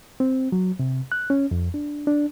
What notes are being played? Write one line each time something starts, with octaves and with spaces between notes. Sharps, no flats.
C4
F#3
C3
F#6
C#4
F2
D4
D4